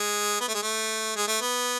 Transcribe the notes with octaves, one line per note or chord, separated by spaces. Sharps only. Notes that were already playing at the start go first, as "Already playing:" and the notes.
Already playing: G#3
B3
A3
G#3
A3
G#3
A3
B3